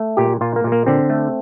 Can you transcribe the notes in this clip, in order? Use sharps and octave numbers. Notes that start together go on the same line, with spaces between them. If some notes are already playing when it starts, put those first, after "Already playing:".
Already playing: A3
A#2 G4
A#2 F4
A#3
A#2
A#3
D3 C4
A3